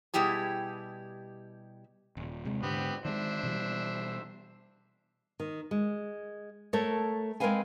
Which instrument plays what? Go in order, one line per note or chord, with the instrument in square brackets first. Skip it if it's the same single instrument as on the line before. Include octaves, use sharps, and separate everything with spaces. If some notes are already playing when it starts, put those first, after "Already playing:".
[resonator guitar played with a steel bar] B2 G3 E4 G4 G#4
[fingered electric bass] D#1
C3 G#3
[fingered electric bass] G#2 D3 [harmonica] B3 C4 G4
[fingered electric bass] D#3 F#3 G#3 [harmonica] D4 C5 E5
[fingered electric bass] B2 E3 G3
[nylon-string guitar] D#3
G#3
A3 A4 A#4 C#5
G#3 C4 A#4 B4 F5 G#5